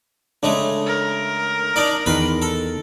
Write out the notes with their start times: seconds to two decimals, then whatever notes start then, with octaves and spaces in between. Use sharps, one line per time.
0.43 C#3 G#3 A3 D4
0.86 A#4
1.76 D4 D#4 D5
2.06 E2 D#3 B4 C6
2.42 A4